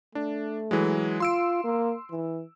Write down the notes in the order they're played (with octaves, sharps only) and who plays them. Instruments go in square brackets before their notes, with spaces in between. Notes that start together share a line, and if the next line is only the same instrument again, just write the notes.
[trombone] A3 [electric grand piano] D4
[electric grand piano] E3 F#3 G#3
[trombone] F4 [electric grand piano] C6 E6 D7
[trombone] A#3
E3